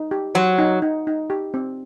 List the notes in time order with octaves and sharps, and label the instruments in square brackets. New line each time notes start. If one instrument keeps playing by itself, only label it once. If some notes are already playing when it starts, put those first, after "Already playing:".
Already playing: [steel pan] D#4
G4
[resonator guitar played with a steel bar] F#3 [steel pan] C5
[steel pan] D#4
D#4
D#4
G4
C4